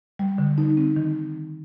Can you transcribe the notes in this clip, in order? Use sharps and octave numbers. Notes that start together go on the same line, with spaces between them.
G3
D3
D#4
C4
D#3